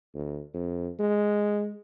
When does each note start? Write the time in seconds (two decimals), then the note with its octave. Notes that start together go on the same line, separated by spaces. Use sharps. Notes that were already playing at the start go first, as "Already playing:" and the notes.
0.15 D2
0.54 F2
0.99 G#3